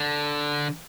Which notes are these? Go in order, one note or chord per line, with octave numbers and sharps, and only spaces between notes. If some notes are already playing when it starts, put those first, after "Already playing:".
Already playing: D3